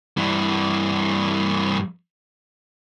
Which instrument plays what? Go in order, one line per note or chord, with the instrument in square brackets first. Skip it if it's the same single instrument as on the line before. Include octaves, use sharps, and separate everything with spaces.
[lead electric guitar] G2 E3